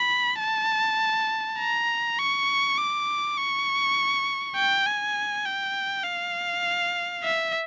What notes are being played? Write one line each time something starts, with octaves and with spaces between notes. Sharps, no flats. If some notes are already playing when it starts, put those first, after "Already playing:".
Already playing: B5
A5
A#5
C#6
D6
C#6
G5
G#5
G5
F5
E5